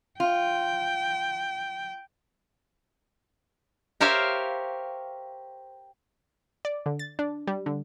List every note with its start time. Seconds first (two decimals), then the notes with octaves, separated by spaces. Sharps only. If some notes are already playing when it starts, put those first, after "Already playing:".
0.20 F4 G5
4.01 G4 A#4 C5 C#5 E5 F5
6.65 D5
6.86 D3
6.99 A6
7.19 D4
7.47 G3
7.66 D3